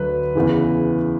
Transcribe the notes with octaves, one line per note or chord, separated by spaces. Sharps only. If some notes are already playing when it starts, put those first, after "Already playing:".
Already playing: D2 D3 F#3 B4
E2 C#3 E3